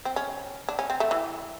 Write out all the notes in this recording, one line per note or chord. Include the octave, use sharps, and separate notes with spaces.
C4
C#4
D4
C#4
C4
A3
E3